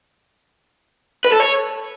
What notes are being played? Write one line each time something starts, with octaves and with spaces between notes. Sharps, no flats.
B4
A4
C#5